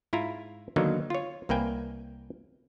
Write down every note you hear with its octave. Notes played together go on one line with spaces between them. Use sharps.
G#2 E4 F4 A#5
D3 D#3 F#3 A#3 B3 D#4
F4 C#5
C2 A#3 B4 G5 G#5